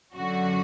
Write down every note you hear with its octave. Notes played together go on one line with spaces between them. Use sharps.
F#2 D3 F#3 F#4